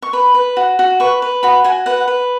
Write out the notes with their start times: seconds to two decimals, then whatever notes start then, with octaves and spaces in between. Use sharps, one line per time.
0.02 C#6
0.13 B4 B5
0.34 B4
0.57 F#4
0.79 F#4
1.00 B4 C#6
1.22 B4
1.43 F#4 B5
1.64 F#4 G#5
1.86 B4 F#5
2.08 B4